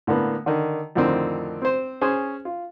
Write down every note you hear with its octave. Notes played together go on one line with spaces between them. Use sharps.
A2 D3 A#3 B3
D3 D#3
F2 A2 D3 D#3 C4
C4 C5
C#4 G#4 C5
F4